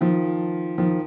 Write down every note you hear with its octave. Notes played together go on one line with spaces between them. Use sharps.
D#3 F3
D#3 F3